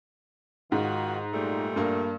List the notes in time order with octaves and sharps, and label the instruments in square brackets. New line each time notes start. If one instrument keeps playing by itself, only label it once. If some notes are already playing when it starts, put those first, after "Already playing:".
[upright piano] G#2 [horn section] D#3 F4 F#4
[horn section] A#2 G3 A3
[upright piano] G2 A#3